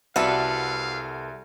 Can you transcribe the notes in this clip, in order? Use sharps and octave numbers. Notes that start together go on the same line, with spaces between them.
C2 F#4 A4 B4 D5 E5 F5